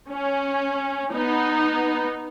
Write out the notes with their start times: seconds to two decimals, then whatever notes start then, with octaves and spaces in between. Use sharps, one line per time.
0.10 C#4
1.12 B3 D#4